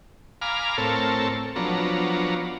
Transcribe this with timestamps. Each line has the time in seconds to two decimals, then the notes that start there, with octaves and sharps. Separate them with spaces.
0.42 F5 G#5 A#5 B5 D6 F6
0.78 A2 C4 A4 A#4 C#5 A5
1.56 F3 F#3 B3 D4 C#5 A#5